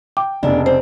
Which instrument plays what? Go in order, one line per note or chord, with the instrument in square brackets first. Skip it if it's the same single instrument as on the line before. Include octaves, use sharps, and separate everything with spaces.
[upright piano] G5 [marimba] D6
[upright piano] F1 C#3 [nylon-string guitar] B3 D4
[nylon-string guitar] C4 [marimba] C5